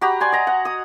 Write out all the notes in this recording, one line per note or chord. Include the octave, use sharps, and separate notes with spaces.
F#4 G4 A#5 B5
D5 G#5 C6
D#5 A#5
F#5
D#6